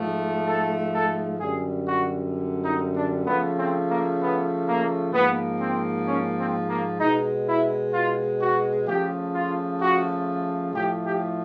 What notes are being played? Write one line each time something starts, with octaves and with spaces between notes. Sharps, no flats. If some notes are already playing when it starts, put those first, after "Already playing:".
Already playing: G#2 F3 A3
A4
A4
F#2 D3 G3 G#4
F#4
D#4
D4
C#3 F3 A3 B3
C4
A#3
B3
A#3
G#2 F3 A#3 B3
C4
C#4
C4
A#3
B2 G#3 D#4
E4
F4
F#4
C#3 F3 A3 G4
F4
F#4
A2 F3 A3 G4
G4